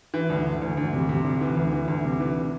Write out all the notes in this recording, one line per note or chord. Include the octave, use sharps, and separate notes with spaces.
E3
D2
D2
D2
D2
C3
C3
D2
E3
D2
E3
D2
C3
E3